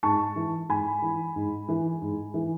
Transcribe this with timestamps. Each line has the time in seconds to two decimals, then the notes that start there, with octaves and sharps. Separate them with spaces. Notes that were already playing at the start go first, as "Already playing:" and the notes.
0.03 G#2 A5 C#6
0.36 E3
0.69 G#2 G#5 B5
1.02 E3
1.36 G#2
1.68 E3
2.02 G#2
2.34 E3